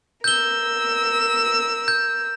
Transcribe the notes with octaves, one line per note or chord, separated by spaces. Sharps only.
A#4 E6 G6 G7
G6